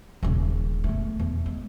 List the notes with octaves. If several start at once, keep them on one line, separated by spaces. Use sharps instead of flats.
D#1 C#3
A3 B3
E2
G#3